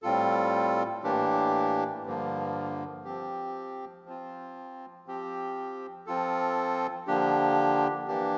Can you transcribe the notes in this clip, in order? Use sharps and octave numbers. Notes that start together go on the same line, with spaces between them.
A2 G3 C4 F4 A4
A2 E3 A#3 D4 G4
G2 D3 F3 A#3
F3 C4 G4
F3 C4 F4
F3 C4 G4
F3 C4 F4 A4
D3 F3 A#3 D4 G4
E3 A#3 D4 G4